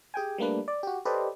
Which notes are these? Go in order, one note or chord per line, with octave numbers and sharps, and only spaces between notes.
G4 G#4 G5 G#5
G3 A3 A#3 D4 B4
D5
F#4 G4
G4 A4 B4 C5 D5 D#5